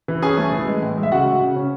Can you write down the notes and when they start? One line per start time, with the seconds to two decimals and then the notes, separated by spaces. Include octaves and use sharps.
0.08 E3
0.22 C#4 G#4 G#5
0.37 A3
0.52 E3
0.67 G#3
0.82 A2
0.97 G#3
1.03 E5
1.12 C#3 F#4 F#5
1.26 C#3
1.41 C#3
1.56 C#4